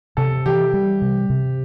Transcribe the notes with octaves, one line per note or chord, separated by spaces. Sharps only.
C3 A4
E3 G4
G3
C3
C3